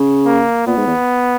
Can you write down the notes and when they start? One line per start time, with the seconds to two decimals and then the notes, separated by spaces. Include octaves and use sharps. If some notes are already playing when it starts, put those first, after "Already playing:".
Already playing: C#3
0.25 A#3
0.66 A#2 B3
0.77 G#2
0.87 E2